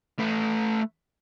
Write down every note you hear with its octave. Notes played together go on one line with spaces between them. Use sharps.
A3 B4